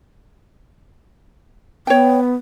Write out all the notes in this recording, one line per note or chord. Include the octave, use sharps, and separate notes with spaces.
B3 C#5 G5